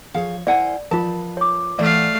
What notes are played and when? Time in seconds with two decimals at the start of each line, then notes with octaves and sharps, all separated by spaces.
0.14 F3 G#4 C#5 F5
0.47 E4 A#4 C5 D5 F#5 G#5
0.91 F3 F4 A#4 B4 A5
1.37 C#5 D6
1.79 A2 E3 A3 D5 F5 F#5